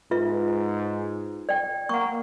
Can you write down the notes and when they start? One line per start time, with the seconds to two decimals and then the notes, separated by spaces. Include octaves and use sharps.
0.11 G#2 F4 B4 E5
1.49 D5 G5
1.89 A#3 F#5 C#6